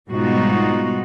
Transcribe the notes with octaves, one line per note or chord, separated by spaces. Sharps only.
G#2 B2 G3 D#4 F4 F#4